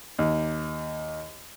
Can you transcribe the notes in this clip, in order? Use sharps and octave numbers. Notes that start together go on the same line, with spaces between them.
D#2